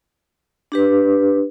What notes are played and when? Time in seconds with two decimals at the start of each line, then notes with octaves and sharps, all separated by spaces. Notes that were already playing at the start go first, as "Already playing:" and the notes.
0.72 D4 G4 B4